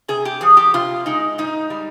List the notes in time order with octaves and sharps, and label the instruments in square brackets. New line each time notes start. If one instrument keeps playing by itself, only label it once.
[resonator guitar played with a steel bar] C3 G#4
G4
F3 G#4
G4
C3 F4
G#3 D#4
G#2 D#4
G3